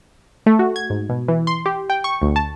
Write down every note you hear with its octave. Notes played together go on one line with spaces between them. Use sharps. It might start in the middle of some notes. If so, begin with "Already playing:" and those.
A3
F#4
G#6
G#2
B2
E3
C6
G4
G5
C#6
D2
A5